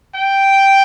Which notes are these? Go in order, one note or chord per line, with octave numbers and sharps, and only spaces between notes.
G5